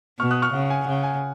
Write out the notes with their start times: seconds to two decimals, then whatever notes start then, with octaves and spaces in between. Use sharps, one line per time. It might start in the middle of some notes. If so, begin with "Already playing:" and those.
0.19 B2 C#6 F6
0.31 D#6 F#6
0.42 C#6 F6
0.53 C#3 F#5
0.70 G#5
0.87 C#3 F#5
1.03 G#5